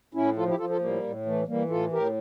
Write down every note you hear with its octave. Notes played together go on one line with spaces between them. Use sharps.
A2 C#4 E4
F3 F4 A4
E4 G4
F3 F4 A4
F4 A4
A2 G3 A#3
A2
E3 A3
E3 G3 A#3
A2 F4 A4
A2 G4 A#4